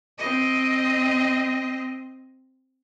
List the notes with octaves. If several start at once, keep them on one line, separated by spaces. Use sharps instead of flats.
C4 D#5